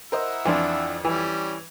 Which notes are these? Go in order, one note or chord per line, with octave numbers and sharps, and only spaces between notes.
E4 A#4 C5 D#5 F#5 E6
F2 E3 F3 D4
E3 G3 C#4